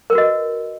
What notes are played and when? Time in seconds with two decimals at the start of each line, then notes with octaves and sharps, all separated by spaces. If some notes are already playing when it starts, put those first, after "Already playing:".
0.10 A#4
0.13 B4
0.15 F#4
0.18 D#5